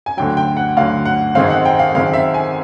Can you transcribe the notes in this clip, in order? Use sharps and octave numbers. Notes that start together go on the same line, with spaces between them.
G#5
D2 D3 F#3 G5
G5
F#5
D2 D3 F#3 F5
F#5
G#1 F#2 D#3 G#3 C4 F5
F#5
G5
F5
G#1 F#2 D#3 G#3 C4 F5
E5
G#5